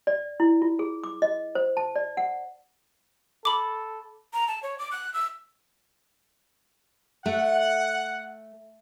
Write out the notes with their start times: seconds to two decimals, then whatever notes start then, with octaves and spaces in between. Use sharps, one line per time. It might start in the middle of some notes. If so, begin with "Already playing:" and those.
0.07 D5
0.40 E4
0.62 F4
0.79 G#4
1.04 D6
1.22 D#5
1.55 C5
1.77 A5
1.96 D5
2.17 F#5
3.45 A4 B5 D6
4.33 A#5
4.48 A5
4.63 C#5
4.79 D6
4.91 F#6
5.14 E6
7.26 A3 F#5